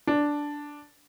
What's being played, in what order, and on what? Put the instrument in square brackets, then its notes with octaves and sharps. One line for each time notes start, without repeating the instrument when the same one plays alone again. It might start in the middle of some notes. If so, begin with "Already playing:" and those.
[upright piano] D4